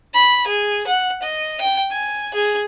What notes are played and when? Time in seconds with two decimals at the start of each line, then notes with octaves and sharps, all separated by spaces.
0.14 B5
0.47 G#4
0.87 F#5
1.22 D#5
1.61 G5
1.91 G#5
2.34 G#4